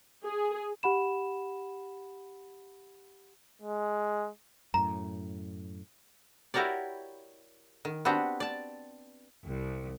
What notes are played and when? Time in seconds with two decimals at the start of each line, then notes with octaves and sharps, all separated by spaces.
0.24 G#4
0.83 G4 F#5 B5 E7
3.62 G#3
4.74 F#2 A2 A#5
6.54 E4 F#4 G4 A#4 C#5 D5
7.85 D#3
8.05 B3 C4 D4 F#4 G4
8.40 D5 A5
9.46 C2